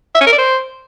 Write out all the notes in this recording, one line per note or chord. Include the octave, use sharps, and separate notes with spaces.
E5
C#4
A#4
D5
C5